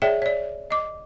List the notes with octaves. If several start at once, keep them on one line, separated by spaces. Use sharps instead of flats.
G#4 C#5 D5 E5 G5
C#5 D5
D#5 D6